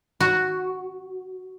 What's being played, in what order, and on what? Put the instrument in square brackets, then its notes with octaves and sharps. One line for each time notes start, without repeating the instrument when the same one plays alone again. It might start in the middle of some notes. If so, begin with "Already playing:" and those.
[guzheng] F#4